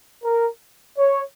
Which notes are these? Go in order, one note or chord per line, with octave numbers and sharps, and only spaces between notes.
A#4
C#5